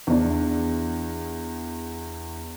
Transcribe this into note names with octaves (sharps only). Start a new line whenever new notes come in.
E2 D4